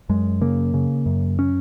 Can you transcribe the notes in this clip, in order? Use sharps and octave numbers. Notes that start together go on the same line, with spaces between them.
F#2 G#3
C#3 A#3
C#3
F#2
C#4